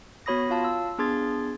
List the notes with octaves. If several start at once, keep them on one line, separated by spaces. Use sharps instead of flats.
B3 F#4 C#5 B5 D#6 A#6
F4 F5 A5
E6
B3 D4 G#4 C6 G#6 A6